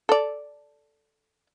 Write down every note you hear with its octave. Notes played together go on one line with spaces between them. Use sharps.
A4 D5